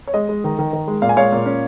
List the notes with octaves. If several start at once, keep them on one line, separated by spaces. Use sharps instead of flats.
C#5
G#3 D#5
G#3
D#3
D#3
D#3
G#3
A#2 F5
G#5
G#3 C#5 F5
A#2
C#4